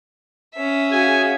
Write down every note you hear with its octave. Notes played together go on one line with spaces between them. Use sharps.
C#4 E5
F#4 G#4 F5 G#5